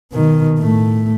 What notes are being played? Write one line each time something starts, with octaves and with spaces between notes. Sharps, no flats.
B2 D#3
A2 A3